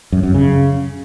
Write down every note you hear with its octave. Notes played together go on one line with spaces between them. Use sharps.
F#2
F#2
C#3